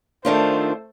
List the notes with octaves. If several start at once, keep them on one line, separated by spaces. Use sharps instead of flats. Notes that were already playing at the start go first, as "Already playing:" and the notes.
D#3 A3 D4 F4 C5